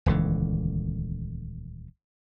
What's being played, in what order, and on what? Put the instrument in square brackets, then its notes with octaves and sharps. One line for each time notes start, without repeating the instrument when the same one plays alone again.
[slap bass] D#1 C#2 D3 E3